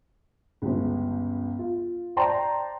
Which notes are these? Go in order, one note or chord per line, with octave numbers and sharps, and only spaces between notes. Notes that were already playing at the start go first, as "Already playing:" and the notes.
G1 C#2
F4
C5 D5 G5 A5 A#5 C6